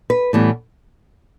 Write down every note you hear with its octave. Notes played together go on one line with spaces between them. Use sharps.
B4
A2 E3 G3 B3